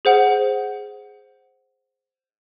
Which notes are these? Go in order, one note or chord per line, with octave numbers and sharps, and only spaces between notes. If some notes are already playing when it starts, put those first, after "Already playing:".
G#4 C5 F#5